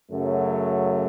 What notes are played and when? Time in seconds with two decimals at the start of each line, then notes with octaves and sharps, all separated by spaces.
0.10 F#2 C#3 F#3 A3